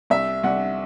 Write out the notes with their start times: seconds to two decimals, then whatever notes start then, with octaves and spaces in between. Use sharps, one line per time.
0.10 C2 E5
0.43 C2 F#5